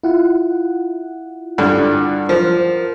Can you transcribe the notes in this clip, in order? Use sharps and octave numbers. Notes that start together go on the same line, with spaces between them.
E4 F4 F#5
G2 D3
F3 A#4